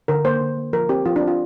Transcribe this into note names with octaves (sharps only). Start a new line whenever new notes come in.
D3 A#4
A#3 C5
D3
A#3
F3 A#4
C4 G4
F3 F4
D4
C4
F4